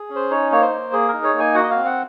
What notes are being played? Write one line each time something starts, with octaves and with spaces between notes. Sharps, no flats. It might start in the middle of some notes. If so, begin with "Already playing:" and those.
Already playing: G#4
C#4
C5
D#4 C#5
A#3 C#5
C5
A#3
G#4
A#4
D#4
C#5
A#3
G#5
F#4 F#5
D#5
F5
C4
F#5